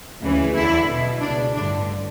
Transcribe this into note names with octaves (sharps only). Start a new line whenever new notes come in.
D2 C#3 E3
E2 D3 E4
B1 B2
C#2 B2 D4
A1 G2 D3 D4